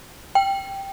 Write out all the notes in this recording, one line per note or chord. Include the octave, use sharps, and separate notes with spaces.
G5